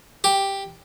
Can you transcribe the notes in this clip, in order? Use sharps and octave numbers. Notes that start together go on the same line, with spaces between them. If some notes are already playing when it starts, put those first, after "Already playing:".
G4